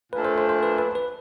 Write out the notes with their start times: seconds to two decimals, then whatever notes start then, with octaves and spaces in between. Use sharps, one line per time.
0.12 A#2 F3 A3 D4 B4
0.25 C5
0.38 C5
0.49 C5
0.63 B4
0.78 B4
0.95 B4